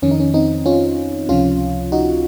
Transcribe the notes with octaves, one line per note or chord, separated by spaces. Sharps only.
F2 D#3 C#4
D#4
C#4
C4 D#4
C#4 F4
C#2 C3 F3 C#4 F4
D#4 F#4